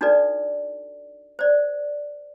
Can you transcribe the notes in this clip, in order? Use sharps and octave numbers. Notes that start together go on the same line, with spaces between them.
D4 D#4 F#4 A4 B4 D5
C5 D5